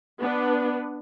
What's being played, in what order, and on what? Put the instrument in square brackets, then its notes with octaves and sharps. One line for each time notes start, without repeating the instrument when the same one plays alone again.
[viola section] B3 D4 B4